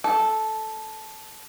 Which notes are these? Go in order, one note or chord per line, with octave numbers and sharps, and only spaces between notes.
A4